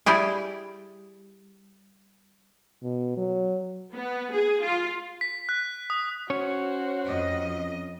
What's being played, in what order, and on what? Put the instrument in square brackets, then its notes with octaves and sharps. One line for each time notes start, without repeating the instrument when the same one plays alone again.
[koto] G3 E4 G4 G#4
[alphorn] B2
F#3
[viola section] B3
G#4
F4
[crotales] B6
F#6
D#6
[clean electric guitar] C#4 C#5 [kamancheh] F#4 C5
[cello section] F2 D#5